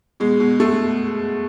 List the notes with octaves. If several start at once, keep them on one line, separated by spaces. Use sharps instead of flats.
B2 G#3
B2
B2 A3